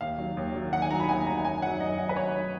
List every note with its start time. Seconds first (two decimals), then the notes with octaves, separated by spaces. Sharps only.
0.01 D#2 F5
0.18 D#3 F#3
0.37 D#2
0.55 D#3 F#3
0.73 D#2 F#5
0.82 G#5
0.90 D#3 F#3 A#5
1.00 B5
1.09 D#2 G#5
1.27 D#3 F#3 A#5
1.45 F#2 G#5
1.62 D#3 F#3 F#5
1.80 F#2 D#5
1.99 D#3 F#3 D#5
2.09 B4
2.16 F#2 C#5
2.35 D#3 F#3